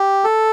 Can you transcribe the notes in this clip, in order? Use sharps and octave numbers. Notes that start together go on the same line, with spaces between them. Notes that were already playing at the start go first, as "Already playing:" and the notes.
Already playing: G4
A4